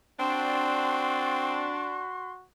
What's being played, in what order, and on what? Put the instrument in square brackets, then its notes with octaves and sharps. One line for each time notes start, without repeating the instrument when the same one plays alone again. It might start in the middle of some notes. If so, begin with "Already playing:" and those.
[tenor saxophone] C4 [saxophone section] D4 [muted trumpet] F#4 [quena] C6